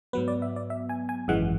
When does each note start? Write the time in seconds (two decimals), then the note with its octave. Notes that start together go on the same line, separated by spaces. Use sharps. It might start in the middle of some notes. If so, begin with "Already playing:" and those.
0.13 G#2 F#3 B3 B4
0.28 D5
0.42 E5
0.56 D5
0.70 E5
0.89 G#5
1.09 G#5
1.28 G#1 F#2 E3 G#3 F#5